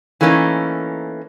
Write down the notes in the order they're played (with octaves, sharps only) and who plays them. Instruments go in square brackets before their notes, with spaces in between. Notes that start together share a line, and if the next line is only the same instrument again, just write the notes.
[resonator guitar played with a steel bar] E3 A3 A#3 C#4 D#4